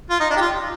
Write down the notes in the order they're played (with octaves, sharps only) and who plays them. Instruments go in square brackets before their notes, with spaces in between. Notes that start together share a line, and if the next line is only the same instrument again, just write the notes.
[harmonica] F4
D#4
D4
G4
F4